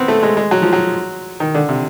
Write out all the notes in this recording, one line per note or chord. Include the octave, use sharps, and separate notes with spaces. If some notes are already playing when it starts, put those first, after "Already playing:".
Already playing: B3 C4
A3
G#3
G#3
F#3
F3
F#3
D#3
D3
C3